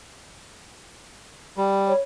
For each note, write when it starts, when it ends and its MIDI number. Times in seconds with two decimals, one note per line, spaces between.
1.57 1.93 55
1.86 2.01 73